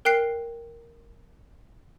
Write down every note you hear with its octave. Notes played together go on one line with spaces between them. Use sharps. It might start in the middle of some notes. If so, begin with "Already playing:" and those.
A#4 G5 F#6 C7